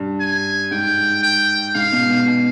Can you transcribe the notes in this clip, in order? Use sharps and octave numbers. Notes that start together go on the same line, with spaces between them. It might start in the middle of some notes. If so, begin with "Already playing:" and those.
Already playing: G2
G#5
G#2 G5
G5
G#2 F5
B2
B2
B2